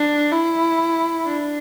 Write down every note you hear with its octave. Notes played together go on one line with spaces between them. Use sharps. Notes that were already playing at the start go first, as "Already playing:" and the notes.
Already playing: D4
E4
D4